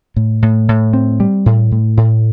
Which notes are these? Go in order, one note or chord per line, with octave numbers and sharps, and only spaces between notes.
A2
A2
A2
C4
G3
A2
A2
A2